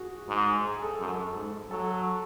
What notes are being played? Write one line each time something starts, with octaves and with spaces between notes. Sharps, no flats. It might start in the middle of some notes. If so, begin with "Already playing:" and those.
Already playing: F#4 G#4
G#2
G#4
A4
F#2
G#2
F#3 A4